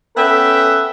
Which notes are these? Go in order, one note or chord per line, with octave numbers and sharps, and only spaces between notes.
B3 C#4 A4 B4 E5 G5